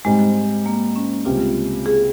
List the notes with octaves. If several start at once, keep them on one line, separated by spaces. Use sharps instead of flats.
G#2 G3 G#3 C4 D#4
A#3
C#4
C#2 C3 G3 F4
G#4